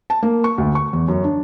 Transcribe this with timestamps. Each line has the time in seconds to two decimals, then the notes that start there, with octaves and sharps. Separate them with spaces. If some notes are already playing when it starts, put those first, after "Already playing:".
0.10 A5
0.23 A#3
0.44 C#6
0.58 D2
0.75 C#6
0.93 E2
1.08 F#2
1.24 D4